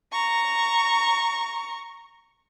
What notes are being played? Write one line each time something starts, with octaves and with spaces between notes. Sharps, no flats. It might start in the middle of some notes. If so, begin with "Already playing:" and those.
A#5 C#6